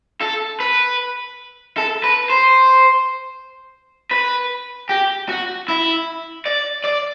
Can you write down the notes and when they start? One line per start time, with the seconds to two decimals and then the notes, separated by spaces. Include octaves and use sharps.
0.21 A4
0.60 B4
1.78 A4
2.04 B4
2.30 C5
4.11 B4
4.89 G4
5.29 F#4
5.68 E4
6.46 D5
6.85 D5